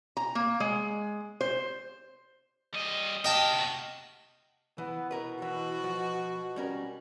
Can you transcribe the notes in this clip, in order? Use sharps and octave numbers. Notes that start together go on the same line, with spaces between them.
A#5
A#3
G#3
C5
G3 D#5
G4 A#4 D#5 G5 A5
C3 F#4
E3 B3
B2 E4 A#4 B4
E3 F#4
F3
G3 C#4 A#4